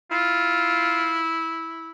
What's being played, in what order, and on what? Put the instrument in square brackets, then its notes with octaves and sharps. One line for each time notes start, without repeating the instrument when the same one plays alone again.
[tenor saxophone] E4 [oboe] F4